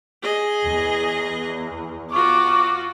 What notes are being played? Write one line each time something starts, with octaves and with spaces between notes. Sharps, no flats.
G#4 D#5
E2
F4 F#4 C#6 D6